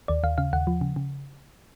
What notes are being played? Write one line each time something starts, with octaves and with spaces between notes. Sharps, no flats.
D#2 D5
D#2 F5
C#3 F5
D#2 F#5
F3
C#3
C#3